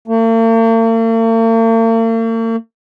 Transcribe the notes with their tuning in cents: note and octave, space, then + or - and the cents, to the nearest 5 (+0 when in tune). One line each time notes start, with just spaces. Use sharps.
A#3 -45